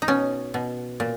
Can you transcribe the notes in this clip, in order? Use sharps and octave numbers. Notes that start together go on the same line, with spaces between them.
D#4
B2 C#4
B2
A#2